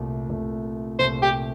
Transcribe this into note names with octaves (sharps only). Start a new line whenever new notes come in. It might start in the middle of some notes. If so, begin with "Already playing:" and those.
Already playing: C2 A#2 A3
C2 A#2 A3
C2 A#2 A3 C5
G4